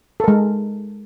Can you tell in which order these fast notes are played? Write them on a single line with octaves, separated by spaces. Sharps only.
A4 A#4 G#3